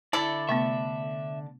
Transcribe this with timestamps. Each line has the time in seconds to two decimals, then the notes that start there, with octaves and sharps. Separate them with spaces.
0.13 D3 D4 E4 A4 D5
0.49 C3 A3 B3 E5